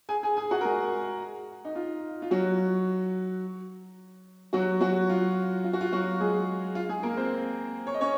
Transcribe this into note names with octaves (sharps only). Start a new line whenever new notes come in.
G#4 G#5
G#4 G#5
G#4 G#5
F#4 F#5
A#4
G#3 G#4
D#4
F4
F4
F#3 F#4
F#3 F#4
F#3 F#4
F4
F4
F#4
F4
F#3 F#4
G#3 G#4
F4
G#3 G#4
A#3 A#4
C4 C5
C#5
D#5
C#4 C#5